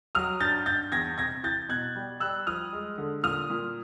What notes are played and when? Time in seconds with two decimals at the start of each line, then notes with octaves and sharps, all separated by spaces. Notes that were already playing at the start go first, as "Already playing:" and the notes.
0.15 F#3 D#6 F6
0.40 G2 G6 A6
0.66 G2 G6 A6
0.92 E2 G#6 A#6
1.18 C3 G#6 A#6
1.43 E3 G6 A6
1.69 B2 F#6 G#6
1.95 G3
2.20 G3 E6 F#6
2.47 F3 D#6 F6
2.73 G#3
2.98 D3
3.23 A#2 D#6 F6
3.50 A#2